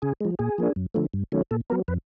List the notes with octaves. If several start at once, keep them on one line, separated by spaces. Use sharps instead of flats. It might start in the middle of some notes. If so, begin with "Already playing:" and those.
C#3 G#4
F3 G#3
A#2 G#4
F3 A#3 D4
F#2
D3 F3 A3
G2
D#3 F#3 A3 C#4
A#2 A4
F#3 B3 A#4
F2 B4